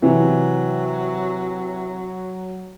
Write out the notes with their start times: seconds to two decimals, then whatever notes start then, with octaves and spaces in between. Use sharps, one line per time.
0.02 C3 E3 F#3